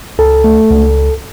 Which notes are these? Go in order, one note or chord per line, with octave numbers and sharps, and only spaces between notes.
C#2 A4
A3
C#2